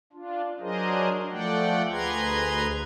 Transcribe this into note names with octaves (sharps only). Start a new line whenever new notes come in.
D4 F4
F#3 D4 G#4 A#4 C5 D#5
F3 A3 D5 F#5 G5
D2 G#4 B4 A#5 C6 G#6